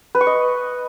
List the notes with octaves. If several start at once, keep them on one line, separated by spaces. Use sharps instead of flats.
B4
C#6
D#5